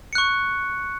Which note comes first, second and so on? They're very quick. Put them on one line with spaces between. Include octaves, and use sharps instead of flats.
C#7 F#6 C#6